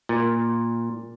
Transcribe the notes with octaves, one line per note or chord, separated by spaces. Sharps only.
A#2